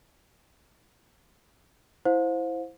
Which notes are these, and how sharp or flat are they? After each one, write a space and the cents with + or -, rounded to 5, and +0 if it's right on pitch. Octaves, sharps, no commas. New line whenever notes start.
E4 +0 C5 +0 F5 +40